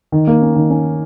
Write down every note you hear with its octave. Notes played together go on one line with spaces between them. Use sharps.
D#3
A#3
C#4
D#3
C#4